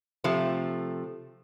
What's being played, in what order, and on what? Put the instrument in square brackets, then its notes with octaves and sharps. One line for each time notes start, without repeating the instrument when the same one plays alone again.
[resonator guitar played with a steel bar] C3 F3 A3